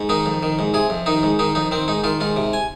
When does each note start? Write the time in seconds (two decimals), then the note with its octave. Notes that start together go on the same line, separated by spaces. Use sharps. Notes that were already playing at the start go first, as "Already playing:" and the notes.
Already playing: G#2
0.09 D#3 D#4
0.26 F2
0.43 D#3
0.59 G#2
0.74 C3 G#4
0.90 F2
1.06 D#3 D#4
1.23 G#2
1.39 D#3 D#4
1.55 F2 D#4
1.71 D#3 C4
1.88 G#2 D#4
2.04 D#3 F4
2.21 G#2 F4
2.36 C3
2.53 G#5